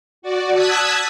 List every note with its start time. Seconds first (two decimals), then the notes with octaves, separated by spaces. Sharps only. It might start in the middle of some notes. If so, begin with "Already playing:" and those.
0.22 F#4 D5
0.53 A5 D#6 E6 F#6 G#6 B6